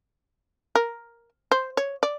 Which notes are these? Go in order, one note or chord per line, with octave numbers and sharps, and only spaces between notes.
A#4
C5
C#5
D5